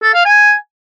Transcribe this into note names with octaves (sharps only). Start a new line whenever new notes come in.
A4
F5
G#5